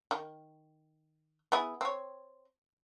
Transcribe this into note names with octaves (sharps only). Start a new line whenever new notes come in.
D#3
B3 E4 G#4
C4 C#5